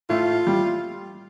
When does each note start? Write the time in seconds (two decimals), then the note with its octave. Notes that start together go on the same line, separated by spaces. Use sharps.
0.09 A2 A3 F4
0.47 G3